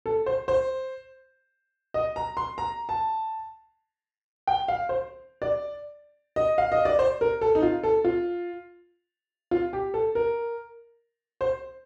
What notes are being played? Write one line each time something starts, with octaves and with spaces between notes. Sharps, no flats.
A4
C5
C5
D#5
A#5
C6
A#5
A5
G5
F5
C5
D5
D#5
F5
D#5
D5
C5
A#4
A4
D#4
F4
A4
F4
F4
G4
A4
A#4
C5